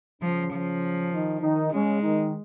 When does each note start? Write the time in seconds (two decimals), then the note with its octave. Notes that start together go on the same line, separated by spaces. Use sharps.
0.21 C#3 F3 C#4
0.53 F3
1.12 D#3 D#4
1.42 D#3 D#4
1.72 C#3 G#3 C#4
2.02 D#3 D#4